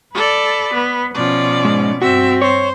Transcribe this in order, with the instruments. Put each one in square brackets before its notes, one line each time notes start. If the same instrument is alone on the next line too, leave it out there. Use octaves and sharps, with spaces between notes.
[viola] A4 D5 [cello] B4
[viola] B3
[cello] B2 C#4 [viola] F3 D5
[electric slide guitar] G#2
[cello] G2 C4 [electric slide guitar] F#4 [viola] E5
[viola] C5 [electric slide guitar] C#5